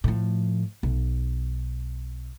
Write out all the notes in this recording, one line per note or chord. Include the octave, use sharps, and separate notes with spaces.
A2 F3
B1